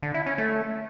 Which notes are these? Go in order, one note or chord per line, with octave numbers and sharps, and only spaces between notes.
D3
E4
C#4
A3